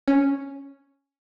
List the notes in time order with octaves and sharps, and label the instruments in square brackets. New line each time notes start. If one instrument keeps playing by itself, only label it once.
[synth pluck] C#4